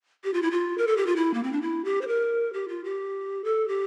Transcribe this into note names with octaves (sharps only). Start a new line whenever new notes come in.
G4
F4
E4
F4
A#4
A4
G4
F4
E4
A#3
C4
D4
E4
G4
C5
A#4
G4
F4
G4
A4
G4